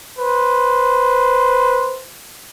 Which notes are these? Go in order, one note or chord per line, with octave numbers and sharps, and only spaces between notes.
B4 C5